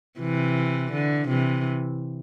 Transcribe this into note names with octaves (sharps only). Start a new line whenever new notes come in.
C3 E3
D3
C3 E3